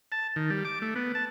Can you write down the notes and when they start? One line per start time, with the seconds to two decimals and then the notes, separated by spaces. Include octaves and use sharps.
0.12 A5
0.36 D#3
0.50 G3
0.65 D6
0.82 A3
0.96 B3
1.15 A5